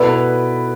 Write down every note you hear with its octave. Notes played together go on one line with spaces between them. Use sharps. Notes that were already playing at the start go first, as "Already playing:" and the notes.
Already playing: B2 B3 E4 A4 B4 D5